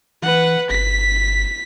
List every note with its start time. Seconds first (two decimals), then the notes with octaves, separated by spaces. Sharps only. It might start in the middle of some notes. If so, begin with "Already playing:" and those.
0.22 E3 B4 F#5
0.70 G1 B6